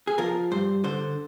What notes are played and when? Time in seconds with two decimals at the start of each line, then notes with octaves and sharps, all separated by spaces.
0.07 G#4
0.18 F3 A#4
0.51 G2 C5
0.84 D3 C5